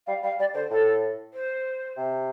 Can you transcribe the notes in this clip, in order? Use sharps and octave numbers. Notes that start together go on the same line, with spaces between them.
G3 F5
G3 F5
G3 D5
D3 C5
A2 A4
C5
C3